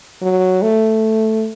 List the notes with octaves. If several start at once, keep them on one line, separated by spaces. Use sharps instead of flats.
F#3
A3